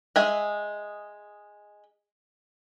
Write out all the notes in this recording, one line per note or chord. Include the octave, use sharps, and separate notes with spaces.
G#3 D#5 E5 G#5